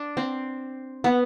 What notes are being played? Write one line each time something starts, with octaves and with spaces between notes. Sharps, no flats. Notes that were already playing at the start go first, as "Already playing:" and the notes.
Already playing: D4
C4
B3